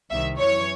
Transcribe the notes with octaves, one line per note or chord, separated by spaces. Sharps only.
C2 C3 D#3 E5
F#2 E3 C#5